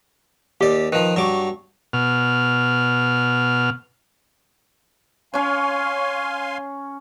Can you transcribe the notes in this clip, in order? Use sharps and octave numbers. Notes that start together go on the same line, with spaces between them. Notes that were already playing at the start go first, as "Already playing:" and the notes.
D#2 G4 D5
D#3 F3 B4
G2 F#3 C#6 D6
B2 F6
C#4 C#5 F5 G#5 C6